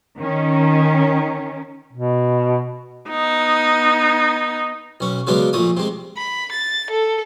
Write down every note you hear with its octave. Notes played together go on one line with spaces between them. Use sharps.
D#3 C#4
B2
B3 D#4
B1 C#4
C#3 F#3 G#3 B3 D4
A#1 A#2 A3 D#6
C3 G#3
B5
A6
A4